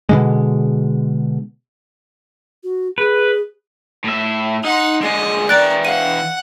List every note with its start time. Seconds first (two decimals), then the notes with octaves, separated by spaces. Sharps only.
0.09 B2 D3 G#3
2.64 F#4
2.98 G#4 B4
4.04 A2 E5
4.64 D#4 F#5 C6
5.02 D3 G#3 D#5
5.49 E3 A#4 D5 G5 F#6 A6 D7
5.85 F5 F#5 D#7